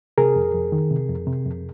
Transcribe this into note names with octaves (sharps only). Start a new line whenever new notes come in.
C3 G#4 A#4
F2
F2
D#3
C3
F2
C3
F2